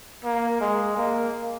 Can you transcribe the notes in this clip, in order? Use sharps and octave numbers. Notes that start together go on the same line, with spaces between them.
A#3
G#3
A#3